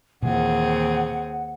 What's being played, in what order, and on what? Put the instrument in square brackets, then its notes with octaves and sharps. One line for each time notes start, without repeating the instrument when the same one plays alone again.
[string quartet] D#2 C4 G#4 [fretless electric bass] A#2 E3 [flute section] F#5